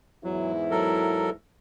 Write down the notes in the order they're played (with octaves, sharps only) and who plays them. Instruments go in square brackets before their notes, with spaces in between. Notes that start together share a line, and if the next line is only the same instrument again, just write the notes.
[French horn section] E2 G#2 E4 [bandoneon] F#3
[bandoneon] F#3 A4 A#4